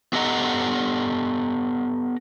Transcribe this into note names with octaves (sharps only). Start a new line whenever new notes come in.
B3 G4 A4 D#5 F#5 A#5